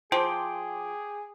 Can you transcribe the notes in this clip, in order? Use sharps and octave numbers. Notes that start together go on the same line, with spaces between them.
F3 G#4 G5 C6 D6